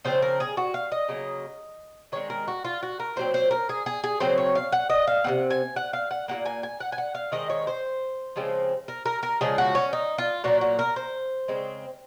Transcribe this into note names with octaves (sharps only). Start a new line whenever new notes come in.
C#3 F3 C4 C5
A#4
G#4
F#4
F5
D#5
C#3 F#3 A#3
D#3 G#3 C4 C#5
A#4
F#4
F4
F#4
A#4
A#2 F#3 C4 C5
C5
A#4
G#4
G#4
G#4
C#3 F#3 C4 C5
C#5
F5
F#5
D#5
F5
C3 F3 C4 F#5
G#5
F#5
F5
F#5
A#2 F#3 A#3 F#5
G#5
G#5
F#5
G#5
F#5
F5
D#3 G#3 C4 D#5
C#5
C5
C#3 F3 G#3 C4
A#4
A#4
A#4
C#3 F3 G#3 G#4
F#4
C#4
D#4
F4
A#2 F#3 A#3 F#4
F#4
A#4
C5
C#3 G#3 C4